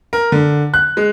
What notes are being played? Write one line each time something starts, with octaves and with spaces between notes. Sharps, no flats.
A#4
D3
F#6
G#3